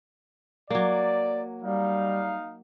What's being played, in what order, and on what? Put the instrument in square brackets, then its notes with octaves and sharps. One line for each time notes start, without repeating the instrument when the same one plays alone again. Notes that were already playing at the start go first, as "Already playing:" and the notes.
[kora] F#3 A#3 [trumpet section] D5
[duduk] G3 [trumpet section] D#4 F5